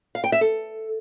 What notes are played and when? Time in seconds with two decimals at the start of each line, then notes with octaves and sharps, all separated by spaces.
0.15 F5
0.24 G5
0.32 E5
0.41 A4